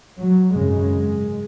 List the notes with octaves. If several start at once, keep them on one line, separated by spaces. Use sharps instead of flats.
F#3
G#1 F#2 C#3 G#3